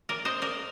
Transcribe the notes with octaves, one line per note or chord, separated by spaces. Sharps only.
A#4 D5
C5 D#5
A#4 D5